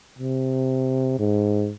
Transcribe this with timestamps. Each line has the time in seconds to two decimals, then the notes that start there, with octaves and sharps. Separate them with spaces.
0.19 C3
1.19 G#2